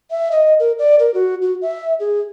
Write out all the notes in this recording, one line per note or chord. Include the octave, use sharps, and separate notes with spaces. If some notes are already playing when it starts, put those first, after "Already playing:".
E5
D#5
A#4
D5
A#4
F#4
F#4
E5
G#4